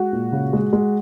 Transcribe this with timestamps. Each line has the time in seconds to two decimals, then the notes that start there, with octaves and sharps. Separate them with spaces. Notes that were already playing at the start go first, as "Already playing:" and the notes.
Already playing: G#3 F#4
0.13 A#2
0.32 C#3
0.53 G#3
0.73 G#3